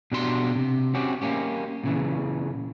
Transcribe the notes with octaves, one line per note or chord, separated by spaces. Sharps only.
B2 D4 F#4 G4 B4 C6
C3
C4 C#4 F#4 G4
A#3 C#4 G4
A#2 C#3 E3